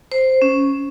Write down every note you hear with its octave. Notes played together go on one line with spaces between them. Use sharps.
C5
C#4